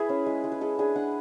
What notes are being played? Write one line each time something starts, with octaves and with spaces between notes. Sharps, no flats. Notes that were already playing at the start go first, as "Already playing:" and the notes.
Already playing: E4 G#4 B4
C#4
G#3
G#3
B4
G#3 A4
D4 G#4
D4 F#5